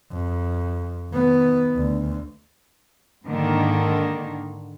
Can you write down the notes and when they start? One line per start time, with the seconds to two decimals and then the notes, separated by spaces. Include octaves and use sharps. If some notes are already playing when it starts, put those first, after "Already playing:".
0.12 F2
1.12 D#3 B3
1.77 D2
3.25 G#2 D3 D#3 A#3